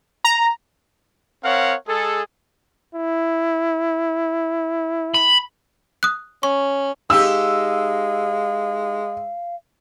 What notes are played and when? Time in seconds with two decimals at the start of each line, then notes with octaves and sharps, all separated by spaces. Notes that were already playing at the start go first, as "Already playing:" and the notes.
0.24 A#5
1.44 C4 A#4 C#5 F5 F#5
1.88 G#3 G#4 A4
2.95 E4
5.14 B5
6.03 D#6 F#6
6.43 C#4 C#6
7.10 G#3 D#4 G4 F5 E6